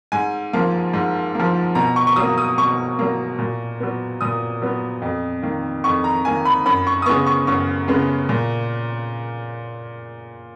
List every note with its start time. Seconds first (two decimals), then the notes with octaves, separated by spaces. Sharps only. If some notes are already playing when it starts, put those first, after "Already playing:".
0.12 G#2 G#5
0.53 F3 A#3
0.94 G#2
1.35 F3 A#3
1.75 B2 A#5
1.96 C#6
2.07 C#6
2.16 F#3 A#3 D#6
2.38 D#6
2.57 B2 C#6
2.99 F#3 A#3
3.39 A#2
3.80 F#3 B3
4.21 A#2 D#6
4.62 F#3 B3
5.02 F2
5.43 D#3 A#3
5.84 F2 C#6
6.04 A#5
6.25 D#3 A#3 G#5
6.45 B5
6.66 F#2 B5
6.87 C#6
7.02 D#6
7.06 C#3 G#3 B3 C#6
7.26 C#6
7.47 F#2 C#6
7.88 C#3 G#3 B3
8.29 A#2